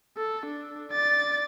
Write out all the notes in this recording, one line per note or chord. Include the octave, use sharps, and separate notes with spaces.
A4
D4
D5 A6